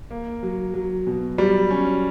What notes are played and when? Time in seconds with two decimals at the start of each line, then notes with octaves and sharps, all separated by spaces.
0.11 A#3
0.43 F#3
0.74 F#3
1.07 B2
1.38 F#3 G3
1.71 C#4